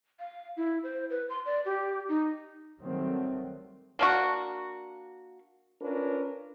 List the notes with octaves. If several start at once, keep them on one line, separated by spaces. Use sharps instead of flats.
F5
E4
C5
B4
C6
D5
G4
D#4
D#3 F#3 G3 A3 C4
A#3 D4 F#4
C#4 D4 F4 A#4 B4